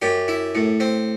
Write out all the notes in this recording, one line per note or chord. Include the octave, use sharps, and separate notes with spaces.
F#2 G4
E4
A2
C4